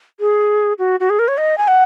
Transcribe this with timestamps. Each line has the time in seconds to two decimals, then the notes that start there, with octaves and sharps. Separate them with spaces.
0.20 G#4
0.79 F#4
1.00 F#4
1.10 G#4
1.19 A#4
1.28 C#5
1.38 D#5
1.58 G#5
1.68 F#5